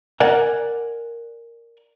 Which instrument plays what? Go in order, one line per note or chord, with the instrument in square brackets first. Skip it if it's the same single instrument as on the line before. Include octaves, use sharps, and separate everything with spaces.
[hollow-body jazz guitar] A#4 D5 F#5 G#5